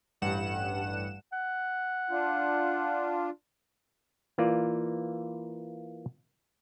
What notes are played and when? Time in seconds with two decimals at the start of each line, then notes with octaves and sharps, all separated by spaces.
0.22 A1 G2 F#5 E7
1.33 F#5
2.10 D4 F4
4.38 E3 A#3 F4 D5